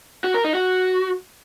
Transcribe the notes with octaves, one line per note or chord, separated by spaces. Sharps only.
F#4
A#4
D#4
F#4